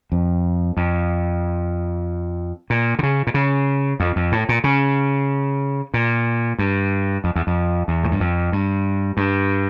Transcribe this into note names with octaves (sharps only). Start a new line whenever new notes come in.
F2
F2
A#2
D3
C#3
A#2
C#3
F2
F2
A2
A#2
C#3
A#2
G2
F2
E2
F2
E2
A2
G2
F2
G2
G2